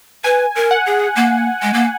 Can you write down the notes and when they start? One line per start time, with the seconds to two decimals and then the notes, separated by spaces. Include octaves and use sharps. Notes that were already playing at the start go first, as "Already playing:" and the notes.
0.24 B4 G#5
0.56 A#4
0.71 F#5
0.86 G#4
1.16 A#3
1.62 G#3
1.74 A#3